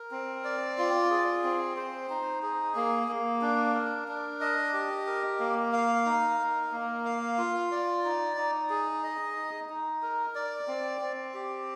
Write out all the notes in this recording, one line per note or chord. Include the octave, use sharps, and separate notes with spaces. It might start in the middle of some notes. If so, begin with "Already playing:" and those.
Already playing: A#4
C4
D5
F4
G#4
C4
C5
D#4
G#4
A#3
A#3
D4
A#4
D4
D#5
G4
A#4
A#3
F5
D#4
A#4
A#3
F5
F4
D5
D#4
D#4
G#4
D#5
D#4
D#4
A#4
D5
C4
C4
G4